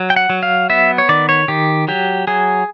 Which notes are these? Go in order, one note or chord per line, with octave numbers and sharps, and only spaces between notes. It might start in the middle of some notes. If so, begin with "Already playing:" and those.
Already playing: F#3
G5
F#5
F#3
F5
B3 E5
C#5
D#3 D5
C#5
D#3 G4
F#3 G4
F#3 G#4